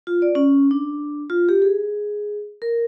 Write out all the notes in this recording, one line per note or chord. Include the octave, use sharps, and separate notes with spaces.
F4
D5
C#4
D4
F4
G4
G#4
A#4